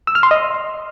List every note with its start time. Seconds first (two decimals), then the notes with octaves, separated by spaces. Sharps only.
0.07 E6
0.15 F6
0.23 C6
0.31 D#5